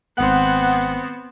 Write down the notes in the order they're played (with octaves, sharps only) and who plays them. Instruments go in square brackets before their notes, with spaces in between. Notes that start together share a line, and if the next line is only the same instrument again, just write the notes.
[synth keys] G#1 F#5 F#6 [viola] B3 C4